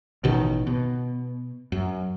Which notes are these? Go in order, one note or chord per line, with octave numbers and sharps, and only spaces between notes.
A1 B2 D#3
B2
F#2